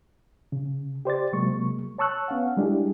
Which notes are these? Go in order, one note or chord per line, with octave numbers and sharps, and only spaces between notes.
C#3
G4 C5 D5 A6
C3 F#3 G#3 A#3 C#6
C#5 A5 C#6 E6 F#6
B3 C#4 F5 F#5
G3 G#3 D4 E4 G4 G#4